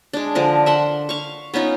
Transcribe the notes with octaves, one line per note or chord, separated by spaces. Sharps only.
G#3 D4
D3 F3 A#4
E5 F#5 C6
F5 C#6
B3 C#4 D#4 F4